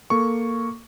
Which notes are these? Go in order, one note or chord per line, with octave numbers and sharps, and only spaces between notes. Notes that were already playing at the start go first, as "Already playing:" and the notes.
A#3 A4 C#6